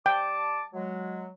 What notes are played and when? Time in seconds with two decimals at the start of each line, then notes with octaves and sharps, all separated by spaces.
0.06 G3 G5 A5 D6
0.73 F#3 G#3